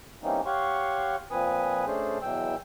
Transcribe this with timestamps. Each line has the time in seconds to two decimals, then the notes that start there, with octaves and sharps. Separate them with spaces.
0.23 E3 G3 A#3 C4 C#4 D#4
0.46 G4 C#5 F5 F#5 C6 C#6
1.31 A#2 F3 C4 B4 G#5 D#6
1.86 A3 C#4 D4 G#4 C5
2.22 E2 B2 E3 F#3 G5 E6